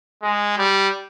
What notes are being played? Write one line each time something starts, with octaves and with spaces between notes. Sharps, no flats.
G#3
G3